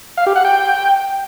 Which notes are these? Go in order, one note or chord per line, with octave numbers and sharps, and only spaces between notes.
F5
G4
F#5
G5